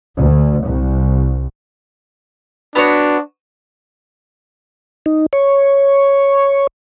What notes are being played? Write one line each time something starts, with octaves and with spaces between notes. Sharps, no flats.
D2
C2
B3 D4 F#4 C#5
D#4
C#5